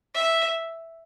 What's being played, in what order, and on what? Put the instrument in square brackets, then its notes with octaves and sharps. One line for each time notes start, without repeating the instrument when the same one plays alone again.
[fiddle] E5